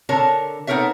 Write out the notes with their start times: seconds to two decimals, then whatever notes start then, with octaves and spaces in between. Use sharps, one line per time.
0.09 D3 A#4 C#5 A5
0.67 B3 D#4 A4 A#4 C#5 E5